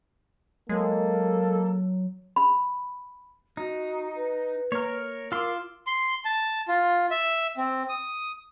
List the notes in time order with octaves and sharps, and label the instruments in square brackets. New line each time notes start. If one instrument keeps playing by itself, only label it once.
[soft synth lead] F#3 [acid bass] G#3 [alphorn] A#3 [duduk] A4
[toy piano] B5
[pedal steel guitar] D#4 [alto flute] F#4
[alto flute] B4
[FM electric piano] A#3 [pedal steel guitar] A#4 C#5
[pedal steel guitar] F4 C6 [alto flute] A#4 [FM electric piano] D6 E6
[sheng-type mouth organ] C6
A5
F4
E5
C4
D#6